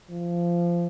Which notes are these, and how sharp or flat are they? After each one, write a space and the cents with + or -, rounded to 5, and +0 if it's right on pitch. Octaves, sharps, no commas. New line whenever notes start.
F3 -20